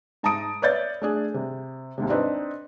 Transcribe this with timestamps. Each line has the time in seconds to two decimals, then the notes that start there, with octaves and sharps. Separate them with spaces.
0.23 G#2 A5 A#5 D#6 D7
0.62 B4 C#5 D5 E5 G6 A6
1.02 A3 D4 G#4
1.34 C3
1.98 D#2 G#2 C3
2.09 C4 D4 D#4 B4